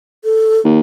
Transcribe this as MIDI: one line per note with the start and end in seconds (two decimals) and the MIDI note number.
0.25 0.60 69
0.65 0.81 39